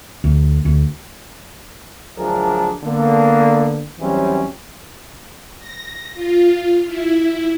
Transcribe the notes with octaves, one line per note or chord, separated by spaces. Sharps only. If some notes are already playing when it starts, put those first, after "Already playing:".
D2
D2
D2 F3 F#3 D4 G#4 A#4
D3 A#3 B3
E2 E3 F#3 G3 C4 C#4
A#6
F4
E4